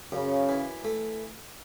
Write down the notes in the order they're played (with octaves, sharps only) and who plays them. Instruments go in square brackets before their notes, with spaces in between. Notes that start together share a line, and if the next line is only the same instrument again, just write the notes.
[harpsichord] F#2 [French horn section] C#3
[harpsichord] E3
A3